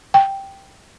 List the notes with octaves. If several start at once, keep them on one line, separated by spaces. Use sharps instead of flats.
G5